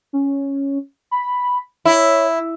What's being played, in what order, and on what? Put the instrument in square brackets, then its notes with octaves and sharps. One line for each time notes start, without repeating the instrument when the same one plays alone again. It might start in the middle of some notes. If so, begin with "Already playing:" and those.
[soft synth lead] C#4
B5
[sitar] E4 [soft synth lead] C#5